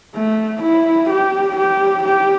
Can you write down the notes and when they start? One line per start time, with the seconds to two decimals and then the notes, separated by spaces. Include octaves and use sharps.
0.15 A3
0.62 E4
1.10 G4
1.56 G4
2.03 G4